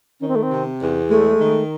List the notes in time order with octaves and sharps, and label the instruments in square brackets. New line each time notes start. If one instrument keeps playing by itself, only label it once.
[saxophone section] D#3 [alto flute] C#4
[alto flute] C4
A3
C4
[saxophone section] C3
E2
[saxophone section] G#3 [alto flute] A3
[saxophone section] D#3